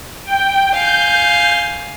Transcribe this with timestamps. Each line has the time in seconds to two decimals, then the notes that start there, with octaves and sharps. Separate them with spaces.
0.23 G5
0.73 F5 G#5 G6